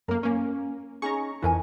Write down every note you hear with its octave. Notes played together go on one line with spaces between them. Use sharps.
F#2 A#3 A#4
A#3 C#4
C#4 D#4 G#4 A#5 C#6
F2 E3 D#4 A#4 G#5